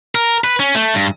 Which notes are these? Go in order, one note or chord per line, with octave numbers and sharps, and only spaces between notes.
A#4
B4
C#4
A3
G2